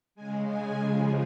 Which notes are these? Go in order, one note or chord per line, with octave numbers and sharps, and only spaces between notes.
C#3 G#3 G#5
G#5
C#3 F3 G#3 G#5